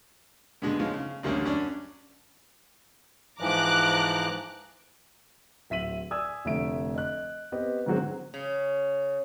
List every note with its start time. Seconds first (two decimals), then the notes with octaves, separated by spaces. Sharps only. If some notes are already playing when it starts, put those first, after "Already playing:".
0.62 G2 B2 D3 G#3
0.79 F3 G#3 C#4 D#4 F4
0.94 C#3
1.23 A1 D2 G3 A#3 C#4 D4
1.44 F#2 C#4 D4 D5
3.40 G#2 E3 F3 A#5 D6 F#6
5.70 D1 E5 B6 D#7 F#7
6.11 D5 G#5 D#6 E6 G#6
6.45 F1 D3 A3 E5 D7
6.95 D#5 F#6
7.52 B3 C4 G4 B4 D#5
7.86 G#2 D3 F#3 C4 F#4 G#4
8.34 C#3